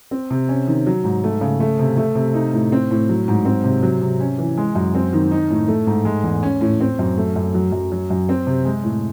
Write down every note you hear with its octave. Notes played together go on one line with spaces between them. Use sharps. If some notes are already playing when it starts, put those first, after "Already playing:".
C4
C3
C#4
D#3
F#3
G#2
A3
C#3
A3
C3
A3
C3
D#4
A2
C4
A2
F#3
G#2
C4
C3
F#3
C3
C#4
E3
G#3
F#2
C4
D#3
D#4
A2
A3
G#2
G#3
E2
C#4
A2
C4
F#2
A3
F#2
F#3
F#2
F#3
F#2
C4
C3
G#3
A2